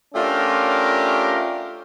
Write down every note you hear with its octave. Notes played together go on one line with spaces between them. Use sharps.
A3 C#4 D4 F4 G4 A#4